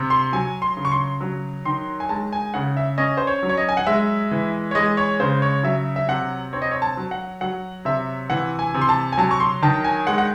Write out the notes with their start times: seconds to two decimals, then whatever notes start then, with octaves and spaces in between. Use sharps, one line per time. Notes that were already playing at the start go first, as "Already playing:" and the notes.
Already playing: C3
0.10 C6
0.33 F#3 G#5
0.62 C6
0.77 C#3
0.85 C#6
0.91 C6
1.21 F#3
1.65 D#3 C6
2.00 G#5
2.09 G#3 A5
2.33 G#5
2.54 C#3 F#5
2.77 E5
2.98 C#4 D#5
3.17 C5
3.27 C#5
3.43 F#3
3.49 C#5
3.57 D#5
3.69 G#5
3.77 F#5
3.87 G#3 E5
4.31 E3
4.71 C#5
4.75 G#3 D#5
4.97 C#5
5.20 C#3 C5
5.42 C#5
5.63 F#3 E5
5.96 E5
6.08 C3 F#5
6.53 C4 C#5
6.62 D#5
6.71 C#5
6.82 A5
6.97 F#3
7.11 F#5
7.41 F#3 F#5
7.85 C3 E5
8.30 E3 F#5
8.59 G#5
8.74 C3
8.82 C6
8.89 A5
9.12 G#5
9.18 F#3 A5
9.31 C#6
9.40 C6
9.62 D#3 A5
9.84 G#5
10.07 G#3 F#5
10.18 F#5